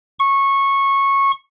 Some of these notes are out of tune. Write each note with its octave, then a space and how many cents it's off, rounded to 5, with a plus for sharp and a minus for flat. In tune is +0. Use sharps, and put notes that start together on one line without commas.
C#6 -15